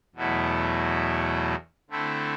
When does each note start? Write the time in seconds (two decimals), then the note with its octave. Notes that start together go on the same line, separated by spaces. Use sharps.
0.16 E2 B2 F#3 A3 E4
1.90 D3 A3 C4 E4